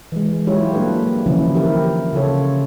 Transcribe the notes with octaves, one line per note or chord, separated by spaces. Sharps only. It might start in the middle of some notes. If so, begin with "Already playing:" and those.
E3 G#3
F#3 G#3 E4 F4 G4 C#5
G3 A#3 D4 E4 A4 B4
D3 E3 F3 C#4 E4
E4 G4 A#4
C#3 F4 A4 C#5